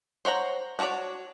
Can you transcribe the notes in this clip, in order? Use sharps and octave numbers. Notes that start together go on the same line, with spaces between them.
C5 C#5 F#5 A#5
D4 F#4 A#4 C#5 D5